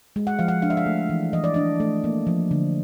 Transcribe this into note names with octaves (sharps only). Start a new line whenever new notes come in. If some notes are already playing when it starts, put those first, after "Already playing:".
G#3
F#5
F3 F5
F#5
D4 F5
E5
F5
A3
E3
E3 D#5
D5
D4 D#5
A3
A#3
F3
D3